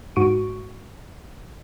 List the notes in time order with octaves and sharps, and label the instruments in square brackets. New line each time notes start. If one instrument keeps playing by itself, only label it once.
[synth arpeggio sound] G#2 F#4 C#6 D7 D#7